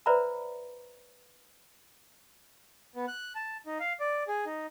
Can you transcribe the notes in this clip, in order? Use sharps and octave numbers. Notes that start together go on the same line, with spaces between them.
B4 C5 D5 E5 A#5 B5
B3
F#6
A5
D#4
F5
D5
G#4
D#4